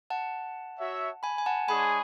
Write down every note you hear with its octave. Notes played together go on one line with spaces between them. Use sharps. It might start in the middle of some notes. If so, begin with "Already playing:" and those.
F#5 A5
F#4 C#5 E5
G#5 B5
G#5
F#5 A5
G#3 D4 G#4 C#5 G#5 B5